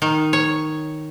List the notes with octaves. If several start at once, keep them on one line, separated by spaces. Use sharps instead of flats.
D#3
C#5